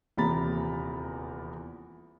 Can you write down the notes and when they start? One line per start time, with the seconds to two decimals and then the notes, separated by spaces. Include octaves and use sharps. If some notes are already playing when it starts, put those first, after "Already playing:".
0.17 D#1 E2 C3 A#5 B5 A6